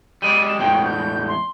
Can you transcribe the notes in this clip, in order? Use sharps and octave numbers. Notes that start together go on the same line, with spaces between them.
G3 G#3 D5 D#7
E7
E2 A2 G#3 G5
G6
C6